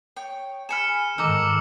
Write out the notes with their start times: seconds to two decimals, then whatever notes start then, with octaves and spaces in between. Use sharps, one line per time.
0.16 C#5 G5
0.69 G#4 G#5 B5 F6 C#7 E7
1.18 G#2 D#3 D#4 A4 D6 E6